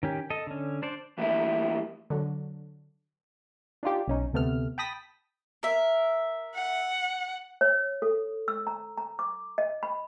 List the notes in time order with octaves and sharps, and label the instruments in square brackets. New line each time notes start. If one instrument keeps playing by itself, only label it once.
[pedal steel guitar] D#3 C#4 G4
A4 D#5
D3 C#4
D4 C5 D5
[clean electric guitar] E3 G3 A3 A#3 E4
[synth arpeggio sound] D3 F#3
[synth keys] D4 D#4 F4 G4
B1 C#4 D#4
D2 C3 A3 B3 F6
G5 A5 B5 D#6 A#6 B6
[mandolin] A#4 E5
[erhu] F#5
[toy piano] C#5
A4
E6
A#5
A#5
D6
D#5
B5